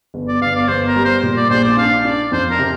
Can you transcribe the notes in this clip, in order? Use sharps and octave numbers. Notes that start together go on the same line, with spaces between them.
G1
D5
G1 F5
D5
G1 C5
A#4
G3
C5
A#2
D5
A#1 C5
D5
D4 F5
D4 D5
F2 C5
A#4
C3